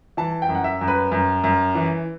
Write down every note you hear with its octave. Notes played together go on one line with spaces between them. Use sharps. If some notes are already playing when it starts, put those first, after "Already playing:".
E3 A5
G5
F#2
F#5
E5
F#2
B4
F#2
F#2
E3